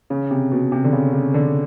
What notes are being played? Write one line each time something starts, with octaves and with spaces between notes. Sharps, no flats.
C#3
C3
B2
C3
D3
C#3
C#3
D3